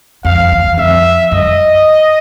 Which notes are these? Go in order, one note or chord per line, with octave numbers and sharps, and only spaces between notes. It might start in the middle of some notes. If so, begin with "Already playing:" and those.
F2 F5
E2
F2 E5
F#2 D#5